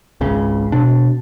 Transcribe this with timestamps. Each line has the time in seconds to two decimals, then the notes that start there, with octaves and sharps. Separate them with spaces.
0.21 G#1 C#2 C#3
0.72 B2 D4